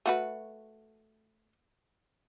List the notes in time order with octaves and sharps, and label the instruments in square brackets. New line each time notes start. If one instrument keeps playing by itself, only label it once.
[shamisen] A3 F#4 B4